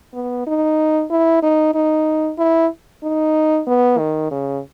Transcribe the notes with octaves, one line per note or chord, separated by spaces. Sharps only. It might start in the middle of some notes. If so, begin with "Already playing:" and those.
B3
D#4
E4
D#4
D#4
E4
D#4
B3
D#3
C#3